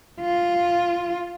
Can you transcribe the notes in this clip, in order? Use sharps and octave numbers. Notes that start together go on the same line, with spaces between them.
F4